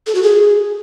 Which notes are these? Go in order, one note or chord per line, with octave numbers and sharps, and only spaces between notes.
A4
F#4
G#4